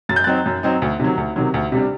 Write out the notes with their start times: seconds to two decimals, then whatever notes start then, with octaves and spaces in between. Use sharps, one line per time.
0.09 F#2 A6
0.16 G6
0.24 F#3 C4 D#4 F#6 A6
0.46 F#2
0.63 F#3 C4 D#4
0.82 D2
1.00 C3 D#3 F#3
1.18 D2
1.36 C3 D#3 F#3
1.54 D2
1.72 C3 G3 D4